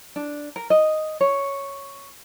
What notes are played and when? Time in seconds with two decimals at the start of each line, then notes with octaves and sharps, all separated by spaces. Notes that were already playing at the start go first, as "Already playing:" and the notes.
0.16 D4
0.56 A#4
0.70 D#5
1.21 C#5